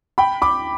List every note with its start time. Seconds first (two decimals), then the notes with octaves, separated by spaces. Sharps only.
0.18 G5 B5
0.42 B5 D6